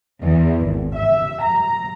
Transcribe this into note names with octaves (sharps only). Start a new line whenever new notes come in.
E2
G#1
E5
A#5